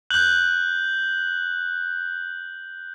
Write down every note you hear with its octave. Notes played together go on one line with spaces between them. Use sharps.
F#6 G6 F#7